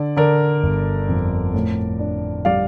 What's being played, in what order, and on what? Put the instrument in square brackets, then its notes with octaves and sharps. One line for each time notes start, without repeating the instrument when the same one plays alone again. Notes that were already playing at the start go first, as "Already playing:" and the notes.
Already playing: [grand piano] D3 D5
D3 A#4 D5
G1
F2
A2
D4
G3 D5 F5